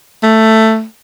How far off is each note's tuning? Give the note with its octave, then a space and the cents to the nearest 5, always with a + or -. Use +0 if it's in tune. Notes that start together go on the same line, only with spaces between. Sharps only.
A3 +10